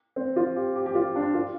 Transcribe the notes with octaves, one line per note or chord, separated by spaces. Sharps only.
C4
F4
G4
G4
G4
F4
D4
F4